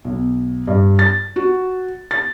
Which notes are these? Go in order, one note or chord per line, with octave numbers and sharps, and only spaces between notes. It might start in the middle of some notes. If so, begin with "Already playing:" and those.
B1
G2
A6
F#4
A6